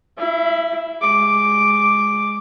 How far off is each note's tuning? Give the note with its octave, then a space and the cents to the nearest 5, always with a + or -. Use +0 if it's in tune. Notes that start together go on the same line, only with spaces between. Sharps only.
E4 +0 E5 +40
G#3 +0 D6 +0